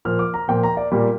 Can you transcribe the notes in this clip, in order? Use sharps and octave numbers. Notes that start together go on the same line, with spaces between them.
A#2 F3 A#3 F6
D6
A#5
A#2 F3 A#3 G5
A#5
D5
A#2 G3 A#3